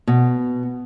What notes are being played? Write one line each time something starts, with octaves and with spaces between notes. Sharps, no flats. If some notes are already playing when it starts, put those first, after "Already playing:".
B2